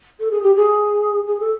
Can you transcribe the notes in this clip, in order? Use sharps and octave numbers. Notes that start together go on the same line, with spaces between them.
A4
G#4
G4
G#4
G#4
A4